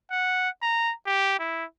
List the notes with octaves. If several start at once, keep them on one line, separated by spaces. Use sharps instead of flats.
F#5
A#5
G4
E4